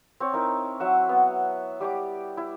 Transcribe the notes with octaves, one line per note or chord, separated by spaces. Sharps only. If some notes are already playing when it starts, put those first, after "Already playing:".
C4 C#5
D#4 E4 A#4
F#3 E5 F#5
B3
G3 G4 D5 D6
E4